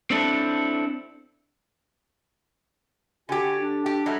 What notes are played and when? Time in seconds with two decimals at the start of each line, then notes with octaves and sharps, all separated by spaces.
0.11 C4 D4 E4 A4
3.29 D3 F#4 G4 G#5
3.61 D4
3.86 G4
4.06 F#3 G3 A3